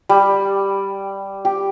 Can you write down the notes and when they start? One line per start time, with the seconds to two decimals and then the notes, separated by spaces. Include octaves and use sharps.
0.09 G3
1.45 G4